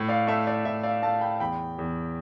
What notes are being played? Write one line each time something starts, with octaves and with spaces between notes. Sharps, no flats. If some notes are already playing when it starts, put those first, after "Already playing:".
Already playing: A2
D5 F5
A3 E5
D5
A2 E5
D5 F5
A3 F5 A5
G5 B5
E2 G5 B5
E2